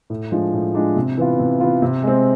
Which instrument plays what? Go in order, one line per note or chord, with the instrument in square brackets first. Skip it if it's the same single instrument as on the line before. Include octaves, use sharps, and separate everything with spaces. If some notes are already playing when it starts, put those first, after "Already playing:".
[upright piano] A2
F3 G#3 D4
A2
F3 G#3 D4
C3
E3 B3 F4
C3
E3 B3 F4
C3
G#3 C4